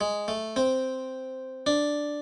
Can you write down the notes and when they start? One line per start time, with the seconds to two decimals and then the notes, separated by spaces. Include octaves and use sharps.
0.01 G#3
0.28 A3
0.56 C4
1.66 D4